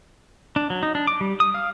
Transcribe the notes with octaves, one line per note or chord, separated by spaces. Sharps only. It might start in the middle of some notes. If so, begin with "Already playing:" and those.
D4
F#3
D#4
D4
D6
G3
D#6
F5